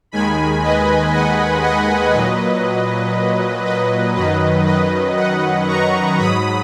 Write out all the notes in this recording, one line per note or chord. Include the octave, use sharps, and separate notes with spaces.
D#2 D#3 G#3 G#5 B5
B4 D#5
D#5 F#5
D#5 F#5
A#2 F#3 B4 D#5
B4 D#5
F#2 D#3 F#3 B4 D#5
B4 D#5
D#5 F#5
A#5 C#6
G#2 F#3 B5 D#6